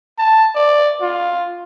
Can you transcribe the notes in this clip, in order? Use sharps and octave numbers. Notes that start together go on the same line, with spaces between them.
A5
D5
F4